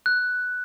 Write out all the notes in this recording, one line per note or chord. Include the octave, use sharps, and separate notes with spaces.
F#6